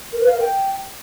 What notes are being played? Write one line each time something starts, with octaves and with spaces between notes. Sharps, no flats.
A#4
B4
F5
A#4
G5